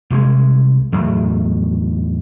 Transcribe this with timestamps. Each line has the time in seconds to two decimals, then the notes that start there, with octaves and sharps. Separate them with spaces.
0.10 C2 F3 G#3
0.92 E2 A2 D#3 F#3